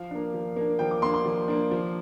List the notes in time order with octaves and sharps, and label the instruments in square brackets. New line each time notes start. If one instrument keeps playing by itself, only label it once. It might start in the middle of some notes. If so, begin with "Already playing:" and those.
Already playing: [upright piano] F3 F5
A#3 D4
F3
A#3 D4
F3 G5
D6
A#3 D4 C6
C6
F3
A#3 D4
F3